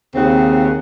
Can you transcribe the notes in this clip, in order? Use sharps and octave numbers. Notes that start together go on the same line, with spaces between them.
D#2 C#3 C4 F#5